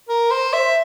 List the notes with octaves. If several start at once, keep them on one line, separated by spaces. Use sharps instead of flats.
A#4
C5
E5